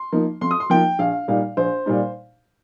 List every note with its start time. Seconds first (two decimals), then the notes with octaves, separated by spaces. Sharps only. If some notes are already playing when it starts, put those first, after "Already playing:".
Already playing: C6
0.12 F3 A#3 D#4
0.41 F2 C6
0.51 D#6
0.60 C6
0.70 F3 A#3 D#4 G5
0.99 A#1 F5
1.28 A#2 G3 D#4 F5
1.57 A#1 C5
1.86 A#2 G3 D#4